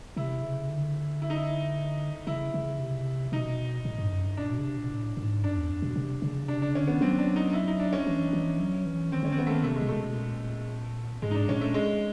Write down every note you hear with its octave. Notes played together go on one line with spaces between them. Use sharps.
C3 E4
C#3
D3
E4
D#4
E4
C#3 E4
C#3
C3
B2 D#4
A2
G2
F#2
G2
A#2 D4
B2
C#3
C3
A#2
A2
G#2
G2 D4
E2
F2
B2
C3
C#3
C3 D4
C#3 D4
D3 C#4
D#3 B3
F#3 C4
D4
D#4
E4
D#4
D4
C#4
E3
E3
F#3
E3
D#3 C4
D3 C#4
C4
D#3 B3
A3
A#3
C3 A3
G#3
B2
A3
C3
B2
A#2
B2
A#2
G#2 G#3
D#4
D4
A#2 C#4
A3
G#3